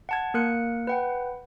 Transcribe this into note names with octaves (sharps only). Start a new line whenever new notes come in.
F#5 A5 G#6
A#3 A#4 F#6 C#7
B4 F#5 G5